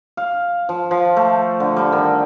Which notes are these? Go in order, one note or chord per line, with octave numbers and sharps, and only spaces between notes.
F5
F3
F3
A3
D3
G3
D#3